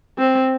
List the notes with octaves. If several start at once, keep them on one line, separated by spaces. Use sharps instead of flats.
C4